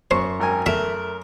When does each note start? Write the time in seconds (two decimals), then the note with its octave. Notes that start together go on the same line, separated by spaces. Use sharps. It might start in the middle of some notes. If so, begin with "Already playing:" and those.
0.11 F#2 C5 C#6
0.40 G#1 A#4 G#5
0.66 A3 A#4 E5